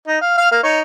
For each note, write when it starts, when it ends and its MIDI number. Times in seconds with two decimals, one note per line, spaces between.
0.07 0.19 63
0.21 0.34 77
0.37 0.48 77
0.37 0.48 89
0.51 0.60 58
0.51 0.60 77
0.63 0.81 63
0.63 0.81 73